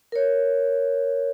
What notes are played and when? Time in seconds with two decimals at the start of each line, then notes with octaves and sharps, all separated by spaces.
0.12 A#4 C#5